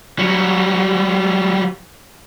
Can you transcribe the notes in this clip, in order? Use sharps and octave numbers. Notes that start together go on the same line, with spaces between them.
F#3 G3